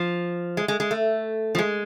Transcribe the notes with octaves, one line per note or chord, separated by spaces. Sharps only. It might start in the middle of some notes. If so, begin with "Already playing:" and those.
Already playing: F3
G#3
G#3
G#3
A3
F3
G#3